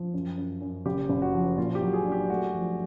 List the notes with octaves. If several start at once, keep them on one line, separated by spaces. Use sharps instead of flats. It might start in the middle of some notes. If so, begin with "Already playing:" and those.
Already playing: F3
F#2
F#2
F#2
F#1 G4
F#1
F#4
F3
A#2 F4
G4
F#3
G#4
D4
G4
A3 F#4
F3